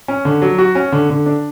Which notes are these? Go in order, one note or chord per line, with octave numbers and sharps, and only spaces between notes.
C#4
D3
F#3
F#4
C#4
D3
D3
D4